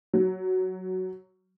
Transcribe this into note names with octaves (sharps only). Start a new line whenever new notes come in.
F#3